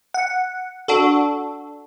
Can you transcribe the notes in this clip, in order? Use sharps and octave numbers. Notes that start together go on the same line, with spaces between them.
F#5
D4 F#4 A4